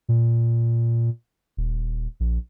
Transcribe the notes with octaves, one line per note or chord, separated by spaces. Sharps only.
A#2
D#1
A#1